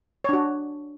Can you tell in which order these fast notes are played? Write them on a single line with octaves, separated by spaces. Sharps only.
C#5 D4 F#4